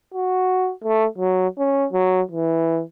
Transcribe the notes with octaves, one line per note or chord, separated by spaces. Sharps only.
F#4
A3
F#3
C#4
F#3
E3